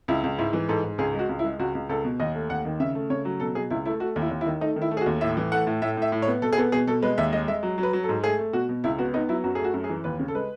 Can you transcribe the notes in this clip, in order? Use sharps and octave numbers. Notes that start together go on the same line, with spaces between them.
C#2 E4
C#2
G#2 E4
E3
G#2 A4
G#2
C#2 G#4
G#3
F#4
C#2
E4
G#3
C#2 F#4
C#2
C#2 A4
B2
D#2 D#5
A3
D#2 F#5
D#3
C#3 E5
A3
C#3 C#5
F#3
B2 A4
B2 G#4
C#2 E4
A3 E4
A3 F#4
D#2
E4
D#2
E4
D#3
A3 D#4
D#3
E4
A3
G#4
F#4
D#2
A2 E5
E3
A3 F#5
A2
A2 E5
A2 E5
A2
C#5
B3
B2 A4
G#4
B3 A4
B2 G#4
B2 A4
G#3 B4
D#2 E5
G#3 D#5
G#3 E5
F#3
F#3
B4
F#3
A4
G#2
A3 G#4
A3
B2 F#4
B2
C#2 E4
B3 F#4
B3 D#4
F#3 E4
F#2 F#4
G#4
A3
F#4
F#2
G#4
E3
D#2 B4
C#3
A4
G#3 B4